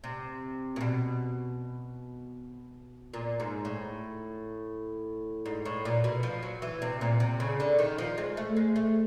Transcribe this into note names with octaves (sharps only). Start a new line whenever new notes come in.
C3
A#2
B2
A#2
G#2
A2
G#2
A2
A#2
B2
F3
F#3
E3
C3
A#2
C3
C#3
D3
D#3
F3
G#3
A3
G#3
A3